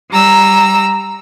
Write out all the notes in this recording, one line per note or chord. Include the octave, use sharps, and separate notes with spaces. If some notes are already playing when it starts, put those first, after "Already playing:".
G3 A#5 E6